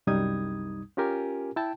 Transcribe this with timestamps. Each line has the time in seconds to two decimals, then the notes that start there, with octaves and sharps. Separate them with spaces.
0.07 C2 F#2 G3 D#4 D#6 G#6
0.97 C#4 F4 G4 A#4 G#5
1.56 E4 G5 A5